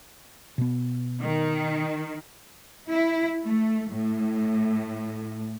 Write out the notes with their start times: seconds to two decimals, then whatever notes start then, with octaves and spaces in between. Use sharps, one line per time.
0.58 B2 B3
1.24 D#3
2.90 E4
3.44 A3
3.90 A2